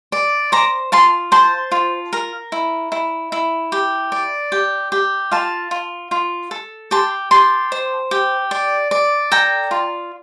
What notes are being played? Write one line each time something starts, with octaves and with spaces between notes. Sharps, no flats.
D5
C5 A#5 D6
F4 A5 C6
C5 A5 C6
F4
A#4
E4
E4
E4
G4
D5
G4
G4
F4 F5 A5
F4
F4
A4
G4 A5 C6
G4 A5 C6
C5
G4
D5
D5
A4 G5 A#5
F4